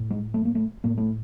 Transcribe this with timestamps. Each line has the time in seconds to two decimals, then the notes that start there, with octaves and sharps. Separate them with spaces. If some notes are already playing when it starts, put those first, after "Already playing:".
Already playing: A2
0.10 G#3
0.34 A3
0.45 A#3
0.55 A3
0.84 A2 A#3
0.98 A3